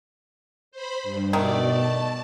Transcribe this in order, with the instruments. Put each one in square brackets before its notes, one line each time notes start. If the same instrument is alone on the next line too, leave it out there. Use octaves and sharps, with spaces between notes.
[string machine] C5 B5
G2
[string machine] B2 D5 [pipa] D#3 A3
[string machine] A5